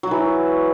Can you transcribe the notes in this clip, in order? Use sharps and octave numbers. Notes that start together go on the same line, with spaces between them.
E3 F#3 F#4